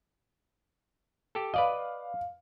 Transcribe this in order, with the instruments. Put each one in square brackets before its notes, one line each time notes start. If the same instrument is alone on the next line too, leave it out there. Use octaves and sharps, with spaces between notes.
[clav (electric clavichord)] G4 A4
[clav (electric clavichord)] B4 D5 D#5 [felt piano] F5